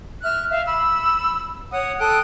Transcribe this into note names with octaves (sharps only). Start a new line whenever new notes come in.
E5 F6 F#6
E5 F5
B5 E6
C#5 F#5 D#6
A4 G5 D#6 F#6